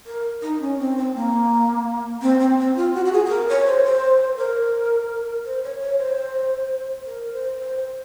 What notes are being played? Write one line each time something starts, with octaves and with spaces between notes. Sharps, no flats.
A#4
D#4
C#4
C4
C4
A#3
C4
C4
C4
F4
F#4
F#4
G#4
G#4
A#4
C#5
C5
C5
A#4
C5
C#5
C#5
C5
A#4
C5
C5
C5